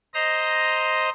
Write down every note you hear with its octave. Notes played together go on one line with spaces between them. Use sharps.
C5 D#5 A#5